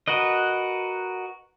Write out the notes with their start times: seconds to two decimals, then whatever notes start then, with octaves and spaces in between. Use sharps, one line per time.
0.08 F#4 A#4 B4 D#5